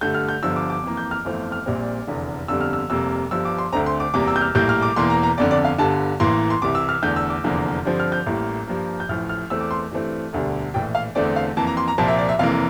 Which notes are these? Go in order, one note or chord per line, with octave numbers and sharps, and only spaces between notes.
G2 D3 A3 G6
F6
G6
G1 G2 D3 F3 E6
D6
D6
F2 E3 A#3
G6
F6
G1 F2 E3 A3 C4
F6
A#1 A#2 G3 C4
F1 E2 D3
G1 F2 D3 G3 E6
F6
E6
F1 F2 C3 G3 A#3 E6
G1 G2 F3 E6
D6
C6
D2 D3 A3 C4 A#5
C6
D6
E2 C3 G3 A#3 D6
E6
G6
F6
A#1 A2 G3 A#3 G6
F6
D6
E1 E2 E3 A#3 C6
A#5
A#5
G1 F2 D3 D5
D5
F5
G1 G2 D3 A5
A1 A2 E3 A#3 C6
C6
C2 C3 E3 D6
E6
F6
E2 D3 A3 G6
E6
D6
F1 E2 D3 F3 A#3
G2 D3 F3 C4
F6
G6
A1 A2 G3 A#3
G2 F3 A#3
G6
A1 A2 F3 F6
F6
E2 E3 A3 C4 E6
D6
C6
G2 E3 A3 C4
E1 D2 D3 G3
A#1 A2 E3 G5
F5
E2 D3 A3 C4 D5
F5
F2 E3 A#3 A5
A#5
C6
A#5
C2 A#2 F3 A#3 A5
E5
D5
E5
F1 F2 E3 A#3 F5